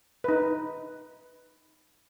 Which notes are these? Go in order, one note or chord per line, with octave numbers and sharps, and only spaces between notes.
D#4 B4